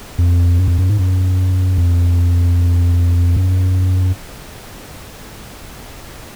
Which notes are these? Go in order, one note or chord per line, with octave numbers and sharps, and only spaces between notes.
F2
F#2
F2
F#2
G#2
F#2
F2
F#2